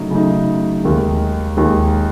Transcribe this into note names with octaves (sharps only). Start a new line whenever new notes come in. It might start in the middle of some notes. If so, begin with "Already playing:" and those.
Already playing: C#3 F#3 A3 D#4
C#3 F#3 A3 D#4
D#2 D#3 G#3
D#2 D#3 G#3